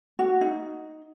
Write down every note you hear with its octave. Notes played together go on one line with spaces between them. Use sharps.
F#4
D#4